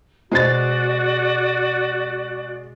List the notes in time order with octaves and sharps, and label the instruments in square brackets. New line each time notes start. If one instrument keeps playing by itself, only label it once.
[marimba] B2 C5 D#5 [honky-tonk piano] G#3 A6 [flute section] F#4 D5